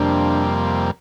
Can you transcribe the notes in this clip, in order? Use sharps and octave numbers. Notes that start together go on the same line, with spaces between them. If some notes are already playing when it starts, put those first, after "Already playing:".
Already playing: F2 C3 G3 A#3 D4